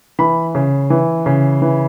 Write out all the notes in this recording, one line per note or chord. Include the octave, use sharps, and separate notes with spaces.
E3 B5
C#3
E3
C#3
E3